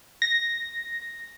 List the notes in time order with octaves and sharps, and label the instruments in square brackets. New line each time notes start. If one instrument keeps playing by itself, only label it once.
[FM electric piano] A#6